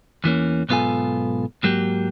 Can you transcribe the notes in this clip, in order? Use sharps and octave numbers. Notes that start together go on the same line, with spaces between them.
E2 E3 A#3 C#4
B1 G#2 B3 F4 A4 G#5
G#2 F#3 A#3 G4